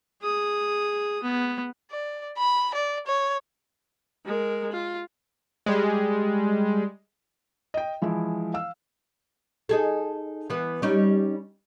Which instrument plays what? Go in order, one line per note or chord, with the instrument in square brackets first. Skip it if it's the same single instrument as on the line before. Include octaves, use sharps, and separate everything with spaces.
[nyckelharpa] G#4 D#6
B3
[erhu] D5
B5
D5
C#5
[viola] G#3 A#4
F4
[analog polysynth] G3 G#3
[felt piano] D#5 G5
E3 F3 G#3 E4
F5 E6
[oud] D#4 G#4 A4
E3 B3
G3 C#4 D#4